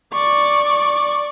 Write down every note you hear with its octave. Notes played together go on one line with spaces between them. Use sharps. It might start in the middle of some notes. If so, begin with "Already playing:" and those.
D5 C#6